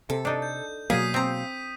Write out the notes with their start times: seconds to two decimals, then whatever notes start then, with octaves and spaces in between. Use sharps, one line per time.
0.10 C3 A4
0.25 D4 D#4
0.42 G6
0.90 B2 F#3 A#3 G#4 F5 D#6 B6 D#7
1.14 C4 A#5